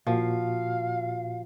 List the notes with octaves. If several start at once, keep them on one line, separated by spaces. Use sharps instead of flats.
A#2 F3 F#4 F5